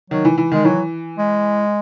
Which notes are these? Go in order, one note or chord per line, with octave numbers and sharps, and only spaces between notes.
D#3 F#3
E3
E3
D#3 G#3
E3 F#3
G#3